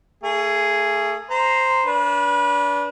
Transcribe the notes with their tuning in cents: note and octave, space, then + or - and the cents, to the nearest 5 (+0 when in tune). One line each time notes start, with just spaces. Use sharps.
A3 +30 G#4 +0
C5 +0 A#5 +0
D4 -30 B4 -25